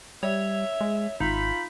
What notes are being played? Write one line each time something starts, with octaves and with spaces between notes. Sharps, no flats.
G3 C#5 E5
G#3
G#1 D#4 F4 B5